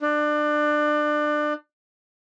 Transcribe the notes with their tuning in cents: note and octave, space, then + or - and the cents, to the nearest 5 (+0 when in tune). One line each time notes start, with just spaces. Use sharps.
D4 +25